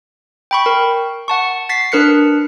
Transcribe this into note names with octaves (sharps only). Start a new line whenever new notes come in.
G5 B5 C#6
A#4
F#5 A5 C#6
A6 B6 C7
D4 A#4 B4 F#6 B6 C#7